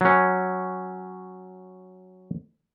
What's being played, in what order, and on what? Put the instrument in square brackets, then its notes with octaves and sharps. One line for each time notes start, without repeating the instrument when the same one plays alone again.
[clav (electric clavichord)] F#3 C#4